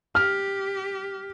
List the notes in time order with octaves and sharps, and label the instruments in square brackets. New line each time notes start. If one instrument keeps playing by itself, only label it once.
[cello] G4 [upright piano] F6